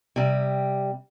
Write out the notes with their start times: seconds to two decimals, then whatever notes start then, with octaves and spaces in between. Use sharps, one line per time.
0.16 C3 G3